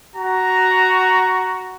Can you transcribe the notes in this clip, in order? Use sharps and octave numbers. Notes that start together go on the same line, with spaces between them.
F#4 A#5